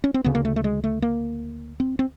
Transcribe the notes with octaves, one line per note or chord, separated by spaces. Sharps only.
C#4
C4
D2 C#3 B3
A#3
A3
A3
G#3
A3
A#3
C4
C4